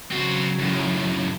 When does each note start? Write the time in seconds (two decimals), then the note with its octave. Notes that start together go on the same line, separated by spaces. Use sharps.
0.11 C#3 F#3 C4 F#4
0.59 F#2 A2